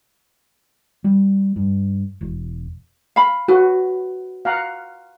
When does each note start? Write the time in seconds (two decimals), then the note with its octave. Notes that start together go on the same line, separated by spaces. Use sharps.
1.04 G3
1.56 G2
2.21 E1
3.16 F5 B5
3.48 F#4 B4
4.45 F5 F#5 A#5